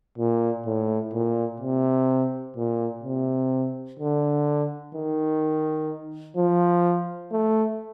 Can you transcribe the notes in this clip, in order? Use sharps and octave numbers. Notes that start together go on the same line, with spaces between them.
A#2
A2
A#2
C3
A#2
C3
D3
D#3
F3
A3